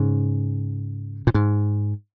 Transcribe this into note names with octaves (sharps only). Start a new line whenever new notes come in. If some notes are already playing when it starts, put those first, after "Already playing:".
Already playing: G#2 C#3
A#2
G#2